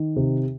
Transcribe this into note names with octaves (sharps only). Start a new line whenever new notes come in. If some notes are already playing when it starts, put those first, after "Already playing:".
Already playing: D#3
C3